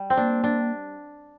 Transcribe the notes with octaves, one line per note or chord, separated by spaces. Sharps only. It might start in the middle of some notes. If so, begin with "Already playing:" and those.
Already playing: G3
C4
A#3 D4
D4